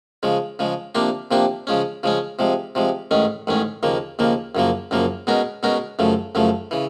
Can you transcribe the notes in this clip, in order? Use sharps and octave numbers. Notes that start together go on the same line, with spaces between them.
C#3 F3 G#3
C#3 F3 G#3
C3 F3 A#3 D4 G4
C3 F3 A#3 D4 G4
C#3 F3 G#3 C#4
C#3 F3 G#3 C#4
C3 F3 G#3
C3 F3 G#3
A1 G#2 D#3 G#3 C#4
A1 G#2 D#3 G#3 C#4
D#2 C#3 F3 A#3
D#2 C#3 F3 A#3
F#2 C#3 F3 A#3
F#2 C#3 F3 A#3
B2 G#3 C#4 F#4 A#4
B2 G#3 C#4 F#4 A#4
F#2 C#3 F3 A3
F#2 C#3 F3 A3
C#3 E3